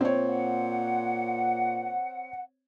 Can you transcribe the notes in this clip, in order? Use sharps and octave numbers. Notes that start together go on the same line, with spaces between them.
A#2 C4 C#5
F#5